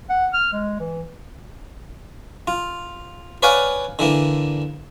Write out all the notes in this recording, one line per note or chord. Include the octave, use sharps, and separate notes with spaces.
F#5
F6
G#3
E3
F4
B4 C#5 D5 F5 F#5 G#5
D3 E3 A#3